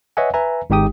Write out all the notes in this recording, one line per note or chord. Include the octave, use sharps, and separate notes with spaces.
B4 C#5 D#5 E5 F#5 G#5
B4 E5 G#5 A#5
G#1 G#3 D#4 G4 G5 D#6